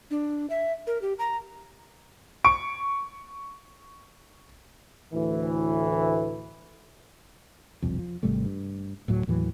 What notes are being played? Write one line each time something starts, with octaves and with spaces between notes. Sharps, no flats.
D4
E5
A#4
G4
A#5
C#6 D7
D2 A2 E3
E1 C2 F2
F3
G#1 C3 G3 A3
G2
D1 A2 F#3
D#2 A2 E3 F#3